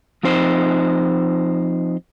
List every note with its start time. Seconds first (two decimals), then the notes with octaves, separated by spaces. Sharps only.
0.23 F3 C4 D#4 C5